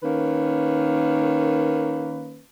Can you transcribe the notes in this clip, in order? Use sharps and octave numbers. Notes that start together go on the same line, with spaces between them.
D#3 A#3 C#4 B4